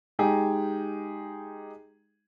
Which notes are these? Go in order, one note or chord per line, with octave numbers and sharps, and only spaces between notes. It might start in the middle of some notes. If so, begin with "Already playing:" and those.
G#3 D#4 G4 G#4